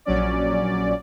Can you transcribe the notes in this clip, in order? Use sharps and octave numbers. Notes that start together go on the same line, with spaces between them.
A#1 F#3 C#4 D5